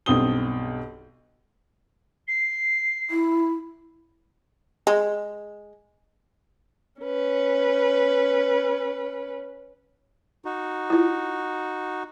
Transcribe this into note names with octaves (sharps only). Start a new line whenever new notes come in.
B1 G2 C4 D#6 G7
C7
E4
G#3
C#4 B4
D#4 F#4
E4 F4